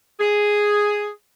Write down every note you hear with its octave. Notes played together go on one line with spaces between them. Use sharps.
G#4